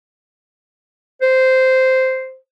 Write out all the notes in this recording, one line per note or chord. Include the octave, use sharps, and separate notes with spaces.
C5